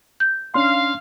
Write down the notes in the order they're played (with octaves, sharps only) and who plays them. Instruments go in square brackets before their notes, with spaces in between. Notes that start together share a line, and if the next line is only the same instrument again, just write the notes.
[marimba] G6
[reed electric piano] C#4 D4 C6 [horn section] F5